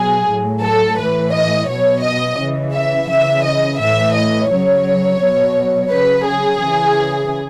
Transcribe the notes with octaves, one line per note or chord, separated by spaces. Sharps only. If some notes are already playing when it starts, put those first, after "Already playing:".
Already playing: B2 F#3 G#4
A2 F#3
A4
A2 E3 B4
D#5
B2 F#3 C#5
D#5
C#3 E3
E5
C#3 E3 E5
D#5
A2 E3 E5
D#5
C#3 F#3 C#5
B2 F#3
C#3 F#3 B4
G#4
C#3 E3